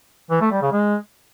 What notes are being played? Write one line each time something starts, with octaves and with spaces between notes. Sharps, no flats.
E3
A3
G3
C#3
G#3